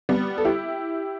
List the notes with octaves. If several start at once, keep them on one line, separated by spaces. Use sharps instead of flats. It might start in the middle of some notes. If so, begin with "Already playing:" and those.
G3 B3
A4
E4 G4